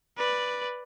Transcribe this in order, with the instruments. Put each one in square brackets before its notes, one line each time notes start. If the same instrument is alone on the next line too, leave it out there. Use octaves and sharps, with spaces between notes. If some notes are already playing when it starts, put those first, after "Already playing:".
[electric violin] B4 D5